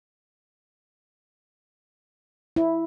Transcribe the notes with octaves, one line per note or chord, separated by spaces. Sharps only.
E4